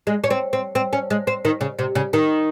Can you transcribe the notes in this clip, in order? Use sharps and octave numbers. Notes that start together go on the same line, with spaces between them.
G#3
C#4
C4
C4
C4
C#4
G#3
C4
D#3
C#3
C3
C#3
D#3